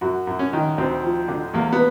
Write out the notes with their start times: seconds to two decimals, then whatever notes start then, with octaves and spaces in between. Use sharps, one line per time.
0.01 F#2 F#4
0.27 F#2
0.39 C#4
0.53 D#3
0.78 D2 C4
1.03 F3
1.28 D3
1.53 E2 A#3
1.73 B3